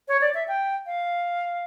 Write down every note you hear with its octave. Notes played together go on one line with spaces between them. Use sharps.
C#5
D5
E5
G5
F5